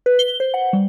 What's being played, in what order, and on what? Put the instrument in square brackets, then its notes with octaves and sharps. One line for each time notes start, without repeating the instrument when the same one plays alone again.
[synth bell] B4
G7
C5
F#5
G3